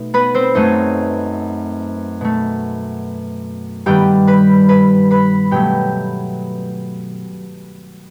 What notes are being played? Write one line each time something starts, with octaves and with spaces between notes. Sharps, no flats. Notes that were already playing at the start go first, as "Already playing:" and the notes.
Already playing: B2 A3 D#4
B3 B4
C4 C5
F#2 F#3 A3 D#4 D#5
B2 A3
G2 D#3 G3 B3 G4 G5
B4 B5
B4 B5
B4 B5
B2 F#3 A3 G4 G5